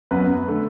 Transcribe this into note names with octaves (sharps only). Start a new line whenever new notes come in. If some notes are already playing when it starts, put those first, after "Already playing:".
F#2 F#3 B3 B4
D3 A3